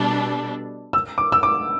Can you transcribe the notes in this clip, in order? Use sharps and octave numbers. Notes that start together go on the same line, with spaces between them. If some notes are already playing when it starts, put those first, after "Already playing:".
Already playing: B2 G3 D4 A4
E6
D6
E6
D6